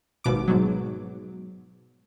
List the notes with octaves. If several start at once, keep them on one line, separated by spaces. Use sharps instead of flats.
G#1 D#2 B2 D6
G#2 B2 F#3